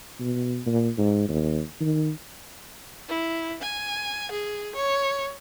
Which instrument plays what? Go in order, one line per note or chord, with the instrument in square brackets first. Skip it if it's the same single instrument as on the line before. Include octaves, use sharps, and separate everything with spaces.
[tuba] B2
A#2
G#2
D#2
D#3
[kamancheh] E4
G#5
G#4
C#5